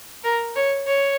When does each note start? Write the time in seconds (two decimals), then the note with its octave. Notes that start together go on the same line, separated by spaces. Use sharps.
0.24 A#4
0.56 C#5
0.87 C#5